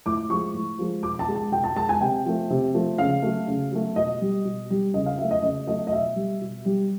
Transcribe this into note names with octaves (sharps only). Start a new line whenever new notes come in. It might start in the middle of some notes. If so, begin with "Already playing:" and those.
A2 D6
F3 G#3 C#6
A2
F3 G#3
B2 D6
A5
G#3
A5
B2 G5
A5
G#3 A5
G#5
C3 G5
F3 A3
C3
F3 A3
C#3 F5
F#3 A3
C#3
F#3 A3
B2 D#5
G3
B2
G3
C#3 D#5
F5
F#3 A3 E5
D#5
C#3 D#5
F#3 A3 D#5
D#5
B2 E5
G3
B2
G3